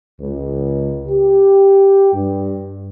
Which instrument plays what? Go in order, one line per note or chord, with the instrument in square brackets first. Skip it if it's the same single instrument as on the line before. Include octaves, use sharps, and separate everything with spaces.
[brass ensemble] C#2
G4
G2